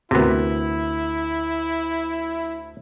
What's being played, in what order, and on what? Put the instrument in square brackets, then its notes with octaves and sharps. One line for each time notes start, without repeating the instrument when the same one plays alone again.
[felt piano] D2 A#4 [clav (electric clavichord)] C3 B3 [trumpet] E4